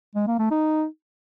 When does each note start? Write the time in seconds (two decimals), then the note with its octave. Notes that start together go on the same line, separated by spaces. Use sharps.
0.15 G#3
0.27 A#3
0.39 A3
0.51 D#4